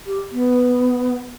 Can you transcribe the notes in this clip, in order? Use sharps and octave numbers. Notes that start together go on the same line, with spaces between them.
G4
B3